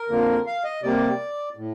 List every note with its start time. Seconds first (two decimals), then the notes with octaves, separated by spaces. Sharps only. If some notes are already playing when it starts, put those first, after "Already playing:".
Already playing: A#4
0.09 F2 D3 F3 A#3
0.47 F5
0.64 D#5
0.83 C3 G3 A#3 D5
1.56 A2